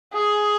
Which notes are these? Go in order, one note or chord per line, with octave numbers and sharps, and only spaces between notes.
G#4